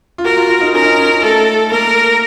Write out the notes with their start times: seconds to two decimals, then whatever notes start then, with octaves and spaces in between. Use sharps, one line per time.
0.18 F4
0.24 F#4 A#4
0.37 F4
0.49 F4
0.61 D#4
0.74 C#4 A#4
0.85 D#4
0.98 C#4
1.22 A3 A4
1.71 A#3 A#4